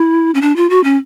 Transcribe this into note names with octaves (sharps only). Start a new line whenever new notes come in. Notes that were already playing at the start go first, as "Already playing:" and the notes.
Already playing: E4
C#4
D4
F4
F#4
C#4